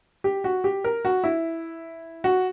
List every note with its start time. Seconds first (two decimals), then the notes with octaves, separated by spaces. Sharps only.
0.24 G4
0.44 F#4
0.64 G4
0.84 A#4
1.05 F#4
1.24 E4
2.24 F#4